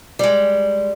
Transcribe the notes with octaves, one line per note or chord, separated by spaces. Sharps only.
G3 G#3